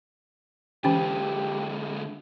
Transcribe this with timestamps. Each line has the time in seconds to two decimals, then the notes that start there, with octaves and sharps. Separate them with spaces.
0.84 D3 E3 G#3 C#4 G4 G5